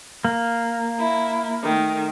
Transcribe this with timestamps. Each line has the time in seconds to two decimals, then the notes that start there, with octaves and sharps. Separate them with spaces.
0.25 A#3
0.99 E4
1.63 D#3 A3